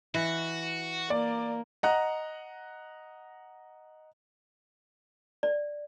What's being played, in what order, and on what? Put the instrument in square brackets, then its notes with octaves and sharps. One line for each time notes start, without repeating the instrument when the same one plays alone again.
[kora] E3 [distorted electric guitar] F#4
[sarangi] A#3 [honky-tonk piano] D5
[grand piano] D#5 F#5 A#5 F#6
[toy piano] D5